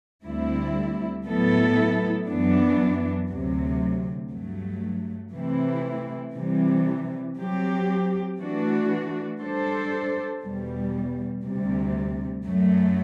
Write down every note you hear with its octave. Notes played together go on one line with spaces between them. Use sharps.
D2 D3 G3 C4 E4
A2 F#3 B3 E4 A4
F#2 E3 B3 D4
D2 C3 F#3
G2 F#3 A3
C3 E3 A3 C4 E4
C3 E3 G3
F#3 C4 G4
E3 A3 D4 F#4
G3 D4 A4 C5
E2 B2 G3
D2 C3 G3
F#2 F#3 A3